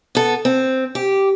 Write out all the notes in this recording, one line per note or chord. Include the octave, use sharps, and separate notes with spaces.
B3 A4
C4
G4